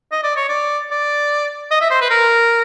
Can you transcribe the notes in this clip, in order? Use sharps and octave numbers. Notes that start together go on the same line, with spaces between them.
D#5
D5
C#5
D5
D5
D#5
E5
C5
B4
A#4